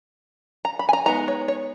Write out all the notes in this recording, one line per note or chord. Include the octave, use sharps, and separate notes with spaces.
A#5
B5
G#5
A#5
G#3 B3 D#4 A#5
C#5
C#5